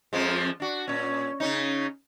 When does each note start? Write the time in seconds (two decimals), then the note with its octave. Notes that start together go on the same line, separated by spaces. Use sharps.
0.13 F2 F3 G#3
0.60 D4 F#4
0.88 A#2 C#4
1.40 C#3 C#4 D#4